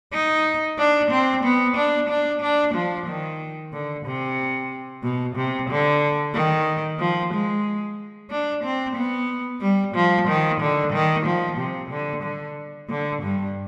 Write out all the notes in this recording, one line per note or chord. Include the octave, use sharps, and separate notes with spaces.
D#4
D4
C4
B3
D4
D4
D4
F3
D#3
D3
C3
B2
C3
D3
D#3
F3
G#3
D4
C4
B3
G3
F3
D#3
D3
D#3
F3
C3
D3
D3
D3
G2